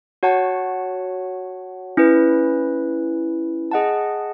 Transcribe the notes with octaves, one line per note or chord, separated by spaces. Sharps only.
F#4 C#5 F#5 A5
C#4 E4 B4
G#4 D#5 F#5 A5